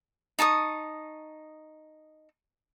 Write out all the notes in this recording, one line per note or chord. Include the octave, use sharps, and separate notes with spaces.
D#4 A5 C#6 D#6